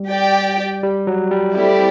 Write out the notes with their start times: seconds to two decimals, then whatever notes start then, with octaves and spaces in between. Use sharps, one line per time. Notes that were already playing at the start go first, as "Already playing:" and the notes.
Already playing: G3
0.10 G4 D5 G5
0.83 G3
1.07 F#3
1.31 G3
1.55 G3 A3 C4 E4 G4 D5